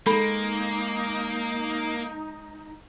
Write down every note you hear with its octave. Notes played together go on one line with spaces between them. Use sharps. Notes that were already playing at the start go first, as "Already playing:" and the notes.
G#3 A#3 D#4 A4 B5